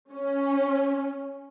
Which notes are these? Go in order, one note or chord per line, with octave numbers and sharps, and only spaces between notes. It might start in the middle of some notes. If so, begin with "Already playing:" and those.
C#4